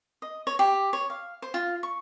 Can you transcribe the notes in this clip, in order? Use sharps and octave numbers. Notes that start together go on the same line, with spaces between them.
D#5
C#5
G4
C#5
F5
C5
F4
C#6